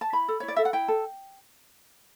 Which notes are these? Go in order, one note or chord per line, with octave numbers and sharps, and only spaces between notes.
A5
E4 B5
A4
E4 C#5
D5
A4 E5
F#5
E4 G5
A4